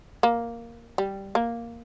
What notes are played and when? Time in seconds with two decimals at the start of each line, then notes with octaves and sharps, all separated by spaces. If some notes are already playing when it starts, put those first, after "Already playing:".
0.23 A#3
0.98 G3
1.35 A#3